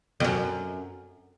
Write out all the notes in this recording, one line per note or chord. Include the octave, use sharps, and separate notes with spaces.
F2
F#2